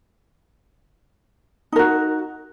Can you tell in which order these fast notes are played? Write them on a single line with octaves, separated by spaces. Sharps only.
D#4 A#4 F#4